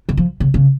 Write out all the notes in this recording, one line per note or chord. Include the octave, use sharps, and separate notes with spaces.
D3
F3
C#3
C#3